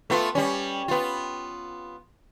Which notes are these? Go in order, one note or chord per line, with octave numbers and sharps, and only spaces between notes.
A3 B3 F4
G3 C#4
B3 F4